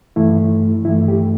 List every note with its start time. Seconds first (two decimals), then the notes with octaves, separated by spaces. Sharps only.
0.16 G2 E3 A3 E4
0.85 G2 E3 A3 E4
1.08 G4